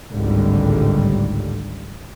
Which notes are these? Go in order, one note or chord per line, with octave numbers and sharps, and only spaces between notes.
G#1 C#2 A2 D3 G3